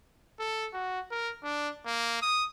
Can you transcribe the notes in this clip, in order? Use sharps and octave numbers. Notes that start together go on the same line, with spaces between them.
A4
F#4
A#4
D4
A#3
D#6